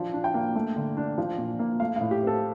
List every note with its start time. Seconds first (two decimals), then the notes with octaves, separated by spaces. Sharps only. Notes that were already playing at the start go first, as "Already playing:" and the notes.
Already playing: F3 D4
0.13 D4
0.24 G5
0.34 A#3
0.55 A3
0.76 D3
0.97 D4
1.18 F3
1.38 A#2
1.59 A#3
1.80 A3 F5
1.96 F5
2.01 A2
2.11 G4
2.22 C4
2.27 A4